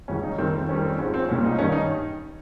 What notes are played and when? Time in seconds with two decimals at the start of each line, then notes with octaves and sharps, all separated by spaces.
0.08 C#2 C#3 G3 C#4
0.23 D#4
0.38 F2 D#3 G3 C4
0.53 C4
0.69 F2 D#3 G3 C#4
0.83 C4
0.99 G#2 F3 G#3 C#4
1.14 C4
1.29 C2 A#2 G3 C#4
1.44 D#4
1.59 G2 D#3 G3 C#4
1.72 D#4